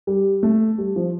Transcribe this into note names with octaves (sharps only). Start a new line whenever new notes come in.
G3
A3
G3
F3